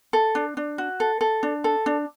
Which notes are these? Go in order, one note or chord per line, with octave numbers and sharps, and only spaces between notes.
A4
D4
D4
F#4
A4
A4
D4
A4
D4